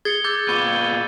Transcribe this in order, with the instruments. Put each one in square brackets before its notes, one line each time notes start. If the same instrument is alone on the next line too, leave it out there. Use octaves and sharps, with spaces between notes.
[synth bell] G#4 [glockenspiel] G#6 A6 [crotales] C#7 G7
[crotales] D6 E6 A6 [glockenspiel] G6
[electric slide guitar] A#2 B3 B4 [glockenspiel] C#6 G#6 G7 [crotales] D6 D#7